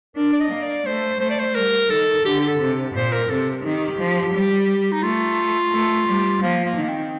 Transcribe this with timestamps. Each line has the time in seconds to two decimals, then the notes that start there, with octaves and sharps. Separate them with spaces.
0.16 D4 A#4
0.32 D5
0.40 D#5
0.51 A#3
0.62 D5
0.86 A3 C5
1.20 A3 C5
1.30 D5
1.39 C5
1.55 G3 A#4
1.90 D#3 A4
2.25 D3 G4
2.40 G4
2.48 A4
2.59 C3
2.94 A#2 C5
3.13 A#4
3.29 C3 A4
3.64 D#3 G4
3.99 F3
4.34 G3
4.91 D#4
5.03 A3 F4
5.72 A3
6.07 G3
6.42 F3 A#3
6.65 A#3
6.77 D#3
6.83 A#3
6.89 C4